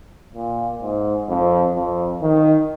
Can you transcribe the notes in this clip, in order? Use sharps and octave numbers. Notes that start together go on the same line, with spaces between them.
A#2
G#2
F2
F2
D#3